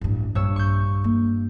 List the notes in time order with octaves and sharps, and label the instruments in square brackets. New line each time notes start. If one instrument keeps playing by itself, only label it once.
[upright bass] A1 G2
[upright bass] A#1 [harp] G2 C#5 E6
[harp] C#6 G6
[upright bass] A#3